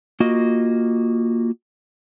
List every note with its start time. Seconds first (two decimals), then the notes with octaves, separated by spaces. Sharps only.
0.20 A#3 F4 F#4 D#5